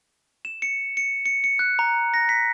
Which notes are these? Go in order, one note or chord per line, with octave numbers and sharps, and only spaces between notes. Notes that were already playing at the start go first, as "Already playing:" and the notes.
E7
C#7
C#7
C#7
C#7
F#6
A#5
A#6
B6